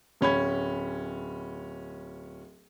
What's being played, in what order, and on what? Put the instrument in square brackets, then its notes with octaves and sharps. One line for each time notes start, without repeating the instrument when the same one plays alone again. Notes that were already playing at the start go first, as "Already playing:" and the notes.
[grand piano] D1 C#4 B5 G#6